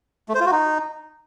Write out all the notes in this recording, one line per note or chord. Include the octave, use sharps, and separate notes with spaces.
A3
C5
F4
F#4
D#4